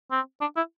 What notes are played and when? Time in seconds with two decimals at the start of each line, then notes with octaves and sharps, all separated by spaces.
0.11 C4
0.41 D4
0.57 E4